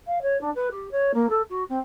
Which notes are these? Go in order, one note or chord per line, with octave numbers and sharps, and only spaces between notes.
F5
C#5
D4
B4
G4
C#5
A#3
A4
F#4
C4